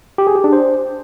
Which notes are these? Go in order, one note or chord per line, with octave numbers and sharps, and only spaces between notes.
G4
G#4
G4
D4
C5